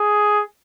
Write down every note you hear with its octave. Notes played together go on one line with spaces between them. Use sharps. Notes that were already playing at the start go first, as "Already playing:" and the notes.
Already playing: G#4